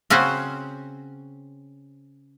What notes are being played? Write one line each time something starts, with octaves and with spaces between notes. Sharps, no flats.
C#3 C4 C#4 F#4 C5